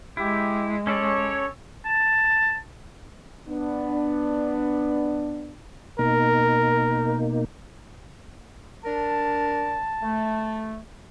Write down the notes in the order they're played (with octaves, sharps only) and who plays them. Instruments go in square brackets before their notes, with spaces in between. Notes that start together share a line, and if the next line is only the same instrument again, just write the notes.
[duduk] G#3 [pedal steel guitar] E4 [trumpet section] G4
[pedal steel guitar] C#4 A4 D5 [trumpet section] C#5
[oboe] A5
[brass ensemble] B3 D4
[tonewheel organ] B2 A#3 D#4 [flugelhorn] A#4
[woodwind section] D4 A#4 [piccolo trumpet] A5
[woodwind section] A3